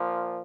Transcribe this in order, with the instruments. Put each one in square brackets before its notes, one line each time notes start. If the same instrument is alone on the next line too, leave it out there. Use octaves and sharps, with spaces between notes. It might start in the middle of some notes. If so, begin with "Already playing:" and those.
Already playing: [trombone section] A#2 F3